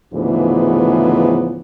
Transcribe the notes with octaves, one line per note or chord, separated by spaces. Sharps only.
D2 G#2 C#3 E3 F3 B3